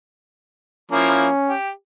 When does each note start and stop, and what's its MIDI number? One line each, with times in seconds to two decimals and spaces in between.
0.92 1.28 53
0.92 1.28 58
0.92 1.54 61
0.92 1.28 64
1.49 1.70 67